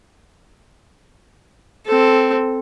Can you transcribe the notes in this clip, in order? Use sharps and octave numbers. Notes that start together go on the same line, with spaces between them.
C4 A4